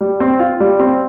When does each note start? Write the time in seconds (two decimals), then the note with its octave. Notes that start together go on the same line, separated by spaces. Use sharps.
0.01 G3
0.20 C4
0.39 F4
0.60 G3
0.80 C4